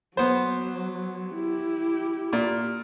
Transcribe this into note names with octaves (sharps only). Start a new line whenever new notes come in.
F#3 B3 C5
E4 G4
A#2